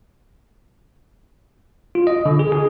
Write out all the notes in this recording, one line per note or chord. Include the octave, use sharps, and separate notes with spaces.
F4
D#5
D3
G#4
G#4